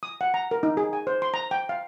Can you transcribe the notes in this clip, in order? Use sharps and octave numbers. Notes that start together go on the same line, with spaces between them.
D#6
F#5
A#5
A#4
D#4
G#4
G#5
C5
C6
A#5
G5
F5